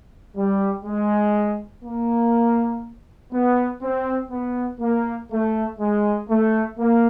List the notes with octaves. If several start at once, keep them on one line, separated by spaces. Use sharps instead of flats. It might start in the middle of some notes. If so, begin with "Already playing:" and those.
G3
G#3
A#3
B3
C4
B3
A#3
A3
G#3
A3
A#3